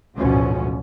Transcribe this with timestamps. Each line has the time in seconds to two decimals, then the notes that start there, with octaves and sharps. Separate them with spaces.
0.16 A1 D2 G#2 B2 F3 C#4